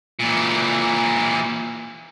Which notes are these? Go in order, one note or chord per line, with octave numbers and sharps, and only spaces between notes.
A#2 E3